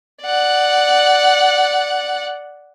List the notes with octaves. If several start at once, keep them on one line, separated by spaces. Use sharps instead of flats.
D5 F#5